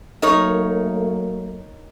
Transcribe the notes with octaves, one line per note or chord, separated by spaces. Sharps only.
F#3 A3 A#3 D#4 A#4 C#5